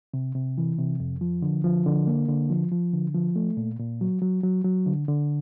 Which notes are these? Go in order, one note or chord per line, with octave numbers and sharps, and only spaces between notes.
C3
C3
E3
C3
F2
F3
D3
F3
D3
A#3
D3
F3
F3
D3
F3
A3
A#2
A#2
F#3
F#3
F#3
F#3
D3
D3